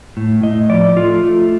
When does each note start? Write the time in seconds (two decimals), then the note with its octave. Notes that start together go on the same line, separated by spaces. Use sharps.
0.17 A2
0.43 A2 D#5
0.70 F3 D5
0.96 A3 F4
1.23 A3